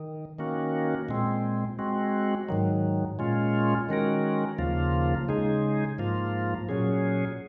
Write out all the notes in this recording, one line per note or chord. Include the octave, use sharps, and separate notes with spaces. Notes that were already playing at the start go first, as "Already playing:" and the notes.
Already playing: D#3
D#3 A#3 C#4 F#4
A#2 G#3 C4
G#3 C4 F#4
G#2 D#3 F#3
A#2 G#3 C#4 F4
D#3 G#3 C#4 F#4 A#4
D#2 C#3 F3 A#3 F4
C#3 G#3 D#4 G#4
G#2 F3 A#3 F4
A#2 F#3 C#4 G#4